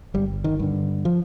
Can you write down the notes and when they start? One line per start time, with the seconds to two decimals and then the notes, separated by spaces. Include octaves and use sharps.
0.14 G1 G3
0.44 D#3
0.59 G2 D3
1.05 F3